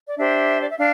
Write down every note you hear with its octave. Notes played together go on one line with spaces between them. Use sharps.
D5
D4 G4 C5 E5
D5
E5
D4 F5